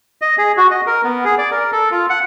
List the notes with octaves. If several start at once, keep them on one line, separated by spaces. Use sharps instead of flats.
D#5
G#4
F#4
D#5
A#4
B3
G#4
D5
A#4
A4
F4
F#5